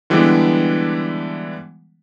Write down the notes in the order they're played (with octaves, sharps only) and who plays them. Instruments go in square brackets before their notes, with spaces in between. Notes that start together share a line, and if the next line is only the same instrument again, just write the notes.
[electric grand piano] D3 E3 G3 G#3 B3 D4